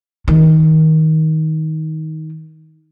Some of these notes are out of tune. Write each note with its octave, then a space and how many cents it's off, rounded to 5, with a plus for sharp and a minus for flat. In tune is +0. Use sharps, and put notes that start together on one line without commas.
D#3 +20